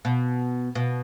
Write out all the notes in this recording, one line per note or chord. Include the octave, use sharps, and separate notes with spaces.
B2
B2